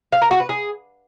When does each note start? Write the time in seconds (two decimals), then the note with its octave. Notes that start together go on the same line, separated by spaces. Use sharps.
0.12 F5
0.22 A#4
0.31 F#4
0.40 B4
0.49 G#4